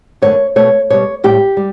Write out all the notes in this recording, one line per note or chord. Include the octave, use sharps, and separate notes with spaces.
F#2 D3 A3 C#5
B2 A3 C#5
B2 G3 C#5
A2 G3 G4
G3